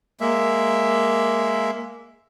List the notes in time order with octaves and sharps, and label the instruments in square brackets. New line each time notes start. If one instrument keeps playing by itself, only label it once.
[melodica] G#3 A#3 E5